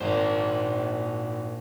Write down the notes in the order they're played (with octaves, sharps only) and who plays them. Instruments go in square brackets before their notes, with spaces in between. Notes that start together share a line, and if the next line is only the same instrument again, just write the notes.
[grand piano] G#1 [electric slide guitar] A#2 A#3 C5